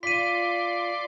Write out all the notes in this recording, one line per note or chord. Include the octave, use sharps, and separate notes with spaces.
F4 D5 C6 B6 D#7